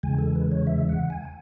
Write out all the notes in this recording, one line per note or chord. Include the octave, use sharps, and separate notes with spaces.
E2 C#3 E3 G#3 G#5
A4
B4
C#5
E5
F#5
G#5